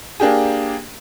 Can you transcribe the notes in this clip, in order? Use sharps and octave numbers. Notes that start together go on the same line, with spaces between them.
A#3 D4 G4 G#4